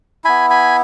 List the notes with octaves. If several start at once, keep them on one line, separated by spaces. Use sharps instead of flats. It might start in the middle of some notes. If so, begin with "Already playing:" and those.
B3 E4 G#5 B5
G#5 B5